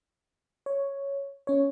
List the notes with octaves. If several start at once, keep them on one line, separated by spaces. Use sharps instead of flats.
C#5
C#4 C#5